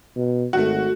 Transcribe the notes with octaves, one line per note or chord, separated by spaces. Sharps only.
B2
G#1 A3 F#4